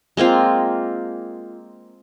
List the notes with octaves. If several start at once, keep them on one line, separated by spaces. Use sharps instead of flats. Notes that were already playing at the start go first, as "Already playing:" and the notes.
G#3 A#3 C4 F4